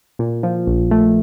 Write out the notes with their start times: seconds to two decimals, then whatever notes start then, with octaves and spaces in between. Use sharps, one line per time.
0.19 A#2
0.43 F3
0.67 A#1
0.91 A3